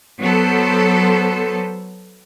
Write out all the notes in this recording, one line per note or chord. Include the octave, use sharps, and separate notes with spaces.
F#3 B3 A4 C5